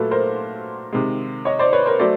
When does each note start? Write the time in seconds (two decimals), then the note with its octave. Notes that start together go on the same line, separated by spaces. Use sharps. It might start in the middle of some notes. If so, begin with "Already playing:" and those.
Already playing: A#2 F#3 A3 A4 B4
0.11 A#4 C5
0.93 C3 D#3 G#3
1.45 C#5 D#5
1.59 C5 D5
1.73 B4 C#5
1.86 A#4 C5
1.99 F#3 A3 C5 D5